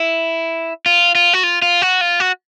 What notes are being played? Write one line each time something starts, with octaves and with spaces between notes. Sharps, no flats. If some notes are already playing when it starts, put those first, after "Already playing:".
Already playing: E4
F4
F4
F#4
F4
F4
F#4
F4
F#4